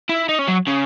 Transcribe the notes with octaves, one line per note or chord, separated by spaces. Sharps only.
E4
D#4
C#4
F#3
C#3